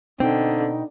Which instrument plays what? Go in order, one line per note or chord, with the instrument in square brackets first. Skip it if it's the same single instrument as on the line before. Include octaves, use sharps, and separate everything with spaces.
[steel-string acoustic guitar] B2 G5 [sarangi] D3 [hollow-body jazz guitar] C4 [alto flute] D#4